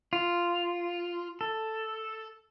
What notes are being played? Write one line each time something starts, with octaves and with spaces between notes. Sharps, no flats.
F4
A4